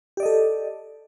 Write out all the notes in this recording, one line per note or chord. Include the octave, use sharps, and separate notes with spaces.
G4 A4 D5 D#5